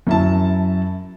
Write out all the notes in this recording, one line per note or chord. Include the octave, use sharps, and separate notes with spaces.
F#2 E4 A5